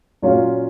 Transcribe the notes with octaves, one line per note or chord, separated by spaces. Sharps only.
A#2 F#3 C#4 F4